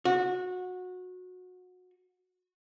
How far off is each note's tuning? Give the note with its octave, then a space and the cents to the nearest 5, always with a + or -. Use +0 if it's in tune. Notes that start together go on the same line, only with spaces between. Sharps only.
F#4 -20